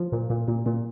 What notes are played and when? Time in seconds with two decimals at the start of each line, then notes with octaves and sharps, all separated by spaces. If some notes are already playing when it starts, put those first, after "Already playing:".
Already playing: F3
0.12 A#2
0.30 A#2
0.48 A#2
0.66 A#2